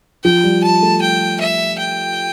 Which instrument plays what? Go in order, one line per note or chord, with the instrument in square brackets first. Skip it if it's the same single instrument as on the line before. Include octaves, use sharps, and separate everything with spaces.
[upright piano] F3 [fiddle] G5
[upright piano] G3
[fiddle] A5
[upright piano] A3
[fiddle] G5
E5
G5